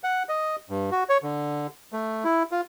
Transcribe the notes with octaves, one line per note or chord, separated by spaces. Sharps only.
F#5
D#5
G2
F#4
C#5
D3
A3
E4
F4